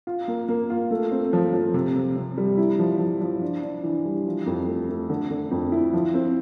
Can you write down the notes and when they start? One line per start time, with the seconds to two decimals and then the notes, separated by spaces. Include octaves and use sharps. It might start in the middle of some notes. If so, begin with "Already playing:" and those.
0.07 F4
0.28 A#3
0.49 A#3
0.70 F4
0.91 A3
1.12 C4
1.33 F3
1.53 F3
1.74 C3
1.96 C3
2.16 C3
2.38 G3
2.58 E4
2.79 F3
2.99 F3
3.21 F3
3.42 D4
3.63 D4
3.84 E3
4.05 G3
4.26 F3
4.46 F2
4.68 A3
4.89 A3
5.10 D3
5.30 D3
5.51 F2
5.72 E4
5.93 F3
6.14 C4